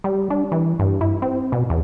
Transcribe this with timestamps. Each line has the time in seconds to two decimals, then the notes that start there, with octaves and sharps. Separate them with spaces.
0.04 G3
0.30 D4
0.52 E3
0.79 G2
1.01 E4
1.22 C4
1.52 B2
1.70 E2